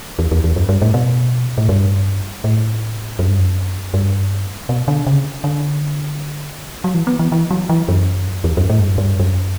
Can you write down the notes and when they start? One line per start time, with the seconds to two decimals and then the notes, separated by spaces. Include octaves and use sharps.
0.19 E2
0.32 E2
0.44 E2
0.56 F#2
0.69 G2
0.82 A2
0.94 B2
1.58 A2
1.69 G2
2.44 A2
3.19 F#2
3.28 G2
3.38 F#2
3.94 G2
4.69 B2
4.88 D3
5.07 C#3
5.44 D3
6.84 F#3
6.94 E3
7.07 B3
7.19 E3
7.32 E3
7.51 F#3
7.69 E3
7.88 F#2
8.44 E2
8.57 F#2
8.69 A2
8.79 G2
8.88 F#2
8.98 G2
9.20 F#2